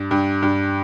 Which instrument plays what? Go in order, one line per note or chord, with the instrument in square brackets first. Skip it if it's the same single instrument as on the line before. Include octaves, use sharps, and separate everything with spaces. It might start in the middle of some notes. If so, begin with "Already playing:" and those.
Already playing: [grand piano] G2
G2
G2